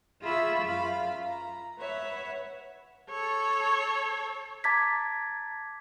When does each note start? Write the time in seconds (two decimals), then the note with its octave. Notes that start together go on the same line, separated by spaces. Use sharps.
0.22 F4 G#4 E5 B5 C#6 E6
0.63 F#2 F4 F5 B5
1.25 A#5
1.79 B4 C#5 E5 F#5
3.10 A4 C#5
4.64 A5 A#5 D6 G#6 A6 B6